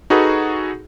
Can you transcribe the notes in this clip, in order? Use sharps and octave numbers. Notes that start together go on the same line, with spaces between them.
D#4 F#4 G#4 A4 B4